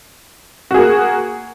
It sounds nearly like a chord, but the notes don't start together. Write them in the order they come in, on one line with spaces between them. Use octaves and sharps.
F#4 G#4 A#3